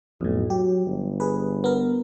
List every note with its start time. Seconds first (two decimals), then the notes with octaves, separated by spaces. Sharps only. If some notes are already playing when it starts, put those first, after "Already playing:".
0.21 B1 F2 A2
0.50 F#3 G4
0.86 G1
1.20 G#4 B4
1.64 B3 A#4